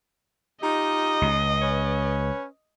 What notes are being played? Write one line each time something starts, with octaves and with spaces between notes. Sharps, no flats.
D#4 F4 G4 D#5
C#2
C#4 B4 C#5